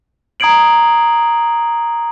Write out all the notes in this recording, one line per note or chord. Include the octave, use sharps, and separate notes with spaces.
A#5 D#6 G#6 C7 D7 F#7